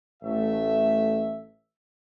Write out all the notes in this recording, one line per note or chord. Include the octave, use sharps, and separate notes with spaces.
A1 A3 E5